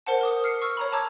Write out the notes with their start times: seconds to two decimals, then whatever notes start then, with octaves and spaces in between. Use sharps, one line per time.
0.06 A#4 C5 F#5 A5
0.21 A#4 D6 D#6
0.44 F6 C7 C#7
0.62 C#6 E6 F6
0.77 C#5 A#5 B5
0.92 A5 A#5 D6 E6 G#6